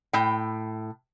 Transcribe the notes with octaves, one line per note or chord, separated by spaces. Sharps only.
A2 G5